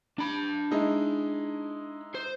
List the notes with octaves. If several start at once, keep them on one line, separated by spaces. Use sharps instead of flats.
D4 B5
G#3 D#4 E4
C5